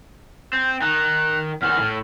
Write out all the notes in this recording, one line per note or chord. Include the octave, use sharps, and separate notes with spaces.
C4 G6
D#3 D#4 F#6
E2 D#3 F6
A2